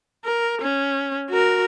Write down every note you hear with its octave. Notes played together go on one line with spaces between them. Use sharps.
A#4
C#4
F#4 A#4